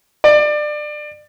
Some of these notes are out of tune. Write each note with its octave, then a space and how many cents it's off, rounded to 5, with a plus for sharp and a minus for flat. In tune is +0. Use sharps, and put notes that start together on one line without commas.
D5 +25